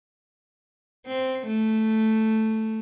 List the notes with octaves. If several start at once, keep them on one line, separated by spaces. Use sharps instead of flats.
C4
A3